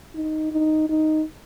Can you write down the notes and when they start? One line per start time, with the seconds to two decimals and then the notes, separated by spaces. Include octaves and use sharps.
0.15 D#4
0.52 D#4
0.89 D#4